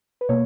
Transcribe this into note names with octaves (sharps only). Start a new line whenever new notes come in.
B4
B2 A#3 C#5